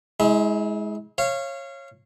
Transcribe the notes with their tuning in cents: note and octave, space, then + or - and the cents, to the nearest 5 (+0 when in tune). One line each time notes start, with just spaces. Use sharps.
G#3 +10 E4 -35
C#5 -20 F5 -25